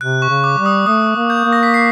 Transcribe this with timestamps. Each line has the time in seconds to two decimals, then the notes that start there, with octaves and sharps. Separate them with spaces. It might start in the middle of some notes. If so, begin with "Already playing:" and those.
0.01 C3 F#6
0.22 C#6
0.29 C#3
0.44 D6
0.58 G3
0.66 D#6
0.86 A3 D#6
1.16 A#3
1.30 G6
1.45 A#3
1.53 A#6
1.63 B6
1.74 C7